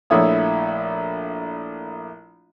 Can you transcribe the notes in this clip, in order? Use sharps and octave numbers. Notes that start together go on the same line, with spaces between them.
A#1 A3 E4 C#5 D#6